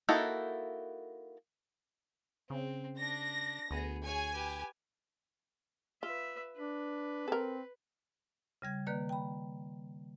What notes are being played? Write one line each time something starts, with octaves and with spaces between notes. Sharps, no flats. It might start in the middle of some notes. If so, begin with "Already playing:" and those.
A#3 D#4 E4 F#4 A4
C#3 C4
D4 A#6
D2 B3 G#4
G#4 C#5 G#5
G4 B4
F4 B4 E5
D4 B4
C4 A4 A#4
C#3 G3 G#6
D#3 A#3 B4 D5 F#6
G5 B5